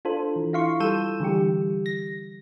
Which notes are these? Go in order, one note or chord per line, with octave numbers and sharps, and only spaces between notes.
D4 F4 A4 C5
E3
E4 F4 F5 C6 C#6
G3 A4 E6 G6 D#7 E7
D3 E3 G3 G4
A#6